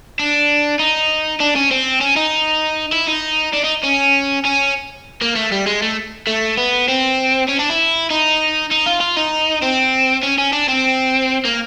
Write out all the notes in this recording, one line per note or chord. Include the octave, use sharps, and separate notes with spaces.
D4
D#4
D4
C#4
C4
C#4
D#4
E4
D#4
D4
D#4
C#4
C#4
A#3
A3
G3
G#3
A3
A3
B3
C4
C#4
D4
E4
D#4
D#4
F4
F4
D#4
C4
C#4
C#4
D4
C4
A#3